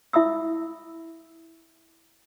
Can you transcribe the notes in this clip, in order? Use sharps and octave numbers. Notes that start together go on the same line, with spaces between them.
E4 E5 B5 D#6 E6